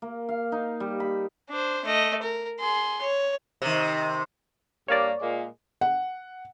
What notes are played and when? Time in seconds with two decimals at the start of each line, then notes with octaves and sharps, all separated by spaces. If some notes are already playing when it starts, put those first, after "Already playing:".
0.02 A#3
0.29 F5
0.52 D#4
0.80 G3
1.00 B5
1.49 D4 C5
1.85 A3 D#5
2.22 A#4
2.59 G#4 C6
3.02 C#5
3.62 C3 D#3
4.88 G2 A#3 C#5 D5
5.21 A#2 G#3 A#3
5.81 F#5